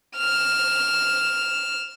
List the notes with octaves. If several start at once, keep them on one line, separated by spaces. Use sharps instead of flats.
F6 E7